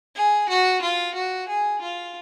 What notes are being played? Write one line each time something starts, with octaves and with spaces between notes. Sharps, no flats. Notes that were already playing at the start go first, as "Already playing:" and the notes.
G#4
F#4
F4
F#4
G#4
F4